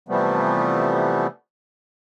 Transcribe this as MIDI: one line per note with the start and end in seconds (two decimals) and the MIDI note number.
0.09 1.27 48
0.09 1.27 52
0.09 1.27 53
0.09 1.27 55
0.09 1.27 57
0.09 1.27 59